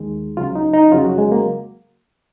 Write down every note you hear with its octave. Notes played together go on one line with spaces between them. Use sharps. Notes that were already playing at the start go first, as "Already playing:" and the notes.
Already playing: D#2 D#3 G#3
C#2 C#3 F#3 F4
D#4
D#4
F2 C#3 F#3 F4
F#4
G#3
A#3